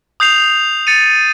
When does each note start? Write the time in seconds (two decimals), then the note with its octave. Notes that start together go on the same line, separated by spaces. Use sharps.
0.20 D#6 G6 C7 F7
0.87 A6 C#7 D#7